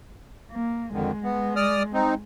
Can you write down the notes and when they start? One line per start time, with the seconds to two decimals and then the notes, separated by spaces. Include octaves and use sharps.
0.51 A#3
0.93 F2 D3 D#3 G#3
1.24 B3
1.56 D5 D#6 F6
1.93 C4 D#4